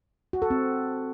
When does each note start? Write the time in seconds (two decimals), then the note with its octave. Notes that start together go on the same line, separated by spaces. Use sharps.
0.33 F#4
0.42 A4
0.50 C4